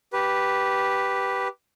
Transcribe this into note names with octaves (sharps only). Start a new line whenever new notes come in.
G4 B4